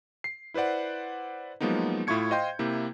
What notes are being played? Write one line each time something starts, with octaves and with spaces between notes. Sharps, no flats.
C7
E4 B4 C5 D5 F#5
F3 F#3 G#3 A#3 B3 D#4
A2 E4 F4 C#6 G#6 C#7
C5 D#5 F5 G5 C6 G6
C3 A#3 E4